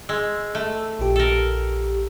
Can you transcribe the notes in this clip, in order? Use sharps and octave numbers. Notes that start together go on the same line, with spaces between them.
G#3 E6
A3
A#1 G4
A4 A#4